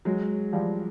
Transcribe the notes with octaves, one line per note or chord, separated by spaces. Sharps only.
F#3 G#3
F3 G3